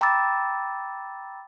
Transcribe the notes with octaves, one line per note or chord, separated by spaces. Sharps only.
G5 A#5 B5 D6 E6 A6